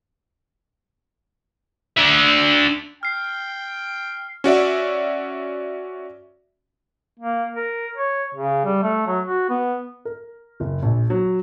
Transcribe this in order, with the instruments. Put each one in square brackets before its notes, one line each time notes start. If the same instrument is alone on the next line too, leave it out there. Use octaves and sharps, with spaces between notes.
[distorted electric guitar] D4 E5
[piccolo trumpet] G5 [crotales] F6 C7
[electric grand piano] C#4 F#4 D5 E5
[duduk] A#3
A#4
C#5
C#3
G3
A3
F#3
F#4
B3
[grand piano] A#4
F#1
A#1
F#3